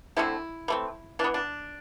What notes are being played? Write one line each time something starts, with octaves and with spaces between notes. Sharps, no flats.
D3 A3 C4 E4
E3 A3 C4
E3 B3 D4
D4